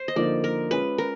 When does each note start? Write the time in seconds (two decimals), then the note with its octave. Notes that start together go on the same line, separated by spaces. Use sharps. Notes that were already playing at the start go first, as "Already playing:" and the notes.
Already playing: C5
0.08 D#5
0.16 D3 F3 A#3 D#4 D5
0.44 A#4
0.71 G#3 C#4 F4 G#4 B4
0.98 A#4